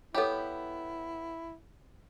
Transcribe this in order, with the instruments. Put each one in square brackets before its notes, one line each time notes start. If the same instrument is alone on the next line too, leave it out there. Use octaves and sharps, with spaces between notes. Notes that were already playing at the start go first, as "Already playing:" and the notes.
[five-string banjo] B3 G4 [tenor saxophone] E4 [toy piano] A4 C#5 B5